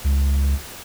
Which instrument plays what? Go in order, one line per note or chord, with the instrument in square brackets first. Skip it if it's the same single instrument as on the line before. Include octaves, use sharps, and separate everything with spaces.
[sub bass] C#2